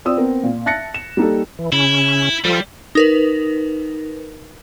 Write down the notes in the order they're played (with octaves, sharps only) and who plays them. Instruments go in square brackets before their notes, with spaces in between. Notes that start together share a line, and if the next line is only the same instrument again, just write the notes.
[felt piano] C4 F4 D5 D#6 E6
B3 C4 A#4
A#2
E5 A5 F#6 A6 A#6 C#7
E7
G3 A#3 D#4 G4 A4
[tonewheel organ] E3
[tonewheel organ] C#3 C#4 [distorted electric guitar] E4
[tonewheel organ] F3 F4 A4 [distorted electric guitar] G3
[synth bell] D#4 A#4 B4